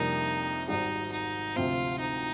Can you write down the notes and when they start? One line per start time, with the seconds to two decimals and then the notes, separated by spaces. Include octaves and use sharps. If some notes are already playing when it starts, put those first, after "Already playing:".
Already playing: F2 C3 G3 A#3 D4 D#4
0.68 G#1 G#2 G3 D#4
1.12 D#4
1.56 D2 C3 F3 C4 F4
2.00 D#4